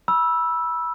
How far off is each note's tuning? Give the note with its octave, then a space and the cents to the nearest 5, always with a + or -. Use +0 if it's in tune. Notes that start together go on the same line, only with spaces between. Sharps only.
B5 -25 E6 +0